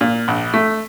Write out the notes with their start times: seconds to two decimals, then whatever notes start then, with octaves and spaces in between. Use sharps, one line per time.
0.01 A#2
0.28 A#1
0.54 A3